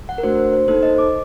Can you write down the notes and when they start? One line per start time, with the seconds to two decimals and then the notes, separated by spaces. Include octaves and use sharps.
0.09 F#5
0.18 A#4
0.23 A3 D4 F#4 C5
0.38 C5
0.53 C5
0.68 A#3 D#4 A4 C5
0.83 D#5
0.98 D6